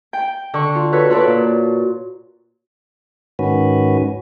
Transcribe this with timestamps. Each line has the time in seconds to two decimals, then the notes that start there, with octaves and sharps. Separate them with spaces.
0.13 G5
0.54 D3 C#6
0.75 F4
0.92 F#4 A4 B4 C#5
1.10 F4 F#4 A4 B4 C#5 D5
1.27 A#2
3.39 G#2 D#3 C#4 F#4 B4